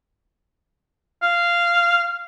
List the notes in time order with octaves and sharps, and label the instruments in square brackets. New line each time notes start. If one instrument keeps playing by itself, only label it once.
[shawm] F5